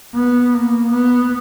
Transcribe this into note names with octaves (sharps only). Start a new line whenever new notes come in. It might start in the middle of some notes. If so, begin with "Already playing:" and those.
B3
A#3
B3